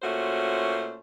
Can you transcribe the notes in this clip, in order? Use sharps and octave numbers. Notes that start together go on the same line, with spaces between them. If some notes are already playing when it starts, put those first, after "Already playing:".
A#2 A3 C#4 F#4 C5